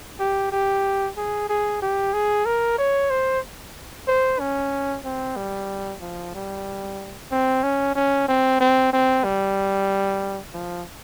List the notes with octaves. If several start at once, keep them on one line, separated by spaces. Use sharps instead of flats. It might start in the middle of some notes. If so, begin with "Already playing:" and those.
G4
G4
G#4
G#4
G4
G#4
A#4
C#5
C5
C5
C#4
C4
G3
F3
G3
C4
C#4
C#4
C4
C4
C4
G3
F3